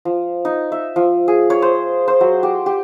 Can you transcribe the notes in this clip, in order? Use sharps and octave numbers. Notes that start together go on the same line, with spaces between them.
F3
D#4
E5
F3
G#4
C#5
C5
C5
F#3
G4
G4